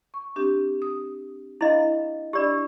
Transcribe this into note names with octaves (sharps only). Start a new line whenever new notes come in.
C#6
C4 D4 G4
D#6
D4 E4 D#5 F5 B5
D4 E4 G4 D5 B5